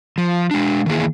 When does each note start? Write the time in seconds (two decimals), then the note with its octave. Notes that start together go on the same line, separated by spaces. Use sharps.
0.18 F3
0.51 G#3 D4
0.86 D#3 E3 A#3 G#4